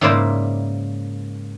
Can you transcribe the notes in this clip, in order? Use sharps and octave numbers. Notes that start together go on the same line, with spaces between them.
G#2 C#3 A#3 E4 C5 D5